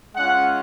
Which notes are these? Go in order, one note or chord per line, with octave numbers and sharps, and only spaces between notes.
G#3 C#4 F4 F#5